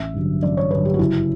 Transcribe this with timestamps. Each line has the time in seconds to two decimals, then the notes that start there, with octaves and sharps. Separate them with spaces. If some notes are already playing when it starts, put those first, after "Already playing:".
Already playing: A1 E5
0.14 G2 D3 F#3
0.43 A1 D5
0.57 C#5
0.71 G2 D3 F#3 B4
0.85 G4
0.94 F#4
0.99 F#1 E4